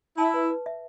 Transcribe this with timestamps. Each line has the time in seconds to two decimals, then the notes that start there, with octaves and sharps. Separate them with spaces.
0.18 E4 A5
0.34 B4
0.50 B4
0.66 E5